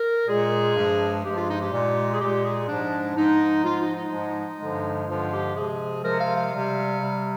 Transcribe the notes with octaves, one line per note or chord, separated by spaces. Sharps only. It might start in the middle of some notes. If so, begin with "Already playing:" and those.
Already playing: A#4
A#2 G#3 G#4
G2 F3 G#3
G2 F3 G#3 G4
F4
D#4
G4
A#2 G#3
G#4
A#2 G#3 G4
G#4
G#2 F3 G#3 D4
G#2 F3 G#3 D#4
G#2 F3 G#3 F4
D#4
D#4
G#2 F3 G#3
G2 D3 F3 G#3
G2 D3 F3 G#3 F4
G4
C3 F3 G#3 G#4
C3 F3 G#3 A#4
F5
F5
C3 G3
C3 G3